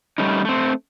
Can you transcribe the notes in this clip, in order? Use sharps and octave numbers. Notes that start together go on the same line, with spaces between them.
G3 A3 C#4 D#4
A3 C4